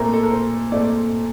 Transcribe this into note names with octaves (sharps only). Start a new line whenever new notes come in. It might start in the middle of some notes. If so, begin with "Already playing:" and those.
Already playing: A#2 A3 C4 A#4
A4
A#4
C5
A#2 A3 C4 D5